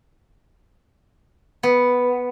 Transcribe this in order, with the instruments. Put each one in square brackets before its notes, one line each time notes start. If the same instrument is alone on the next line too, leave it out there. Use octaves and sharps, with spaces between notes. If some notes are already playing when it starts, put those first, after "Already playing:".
[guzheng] B3